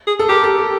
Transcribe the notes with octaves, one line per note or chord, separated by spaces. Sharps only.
G#4
A4
G4 A#4
A4
G4